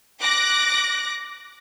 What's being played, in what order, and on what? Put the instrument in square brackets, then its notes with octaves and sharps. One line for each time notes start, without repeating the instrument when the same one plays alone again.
[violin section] D6 F#6 A#6